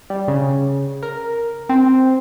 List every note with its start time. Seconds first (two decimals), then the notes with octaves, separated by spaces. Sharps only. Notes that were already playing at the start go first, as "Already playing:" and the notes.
0.10 G3
0.28 C#3
1.02 A#4
1.69 C4